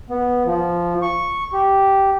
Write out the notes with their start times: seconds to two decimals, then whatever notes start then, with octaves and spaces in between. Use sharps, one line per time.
0.10 B3
0.45 F3
1.02 C#6
1.53 G4